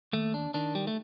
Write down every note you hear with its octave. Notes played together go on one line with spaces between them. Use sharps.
D#2 A3
D4
D#3 D4
G3
A3